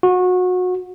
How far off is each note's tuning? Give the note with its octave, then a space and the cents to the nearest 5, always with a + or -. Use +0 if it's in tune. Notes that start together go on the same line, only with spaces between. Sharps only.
F#4 -25